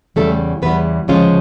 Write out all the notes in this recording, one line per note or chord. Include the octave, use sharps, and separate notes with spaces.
E2 C#3 E3 G3 A3 A4
E2 C#3 E3 G3 B3 B4
D2 C#3 F3 G#3 C#4 F4